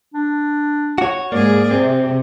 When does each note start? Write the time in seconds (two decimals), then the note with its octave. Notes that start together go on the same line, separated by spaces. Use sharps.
0.14 D4
0.98 F#4 C#5
1.32 G#2 A#3 G#4 D5
1.71 C3 C4